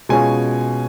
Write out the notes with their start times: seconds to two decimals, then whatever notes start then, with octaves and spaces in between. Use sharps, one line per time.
0.09 B2 G#3 C#4 F4 G#5